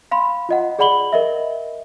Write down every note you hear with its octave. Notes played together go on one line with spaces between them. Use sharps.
F5 B5 C6
F4 D#5 F#5
G#4 D5 F#5 B5 F#7 G7
A#4 D#5 E5